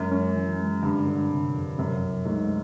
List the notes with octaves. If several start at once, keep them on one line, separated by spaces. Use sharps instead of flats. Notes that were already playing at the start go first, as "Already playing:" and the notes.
Already playing: F#2 G#3
C#4
E3
G#3
G2 D3
D3
C3
F2
F#2 C3
C2
G#2 A3